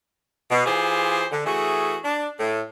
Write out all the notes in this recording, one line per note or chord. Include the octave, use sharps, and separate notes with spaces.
B2
E3 F4 G4 G#4 C5
D3
E3 A3 F#4 G#4
D4
A2